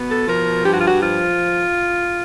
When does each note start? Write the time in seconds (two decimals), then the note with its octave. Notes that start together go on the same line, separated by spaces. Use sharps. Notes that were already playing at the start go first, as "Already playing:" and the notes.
Already playing: B2 B3
0.10 A4
0.28 F3 A#4
0.65 G2 G4
0.73 F#4
0.80 F4
0.87 F#4
1.03 F3 F4